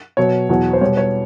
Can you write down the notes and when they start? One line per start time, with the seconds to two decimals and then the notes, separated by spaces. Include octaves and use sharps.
0.17 B2 F#3 C#5
0.49 E2 B2 F#3
0.73 C5
0.81 B2 G3 C#5
0.97 C#5